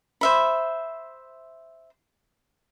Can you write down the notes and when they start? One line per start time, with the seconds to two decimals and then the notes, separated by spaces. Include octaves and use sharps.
0.21 C5 E5 B5